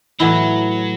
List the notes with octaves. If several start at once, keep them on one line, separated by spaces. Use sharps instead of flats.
A2 E3 F#3 B3 E4